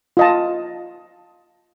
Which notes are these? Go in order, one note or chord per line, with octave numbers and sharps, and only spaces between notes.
F4 D#5 A5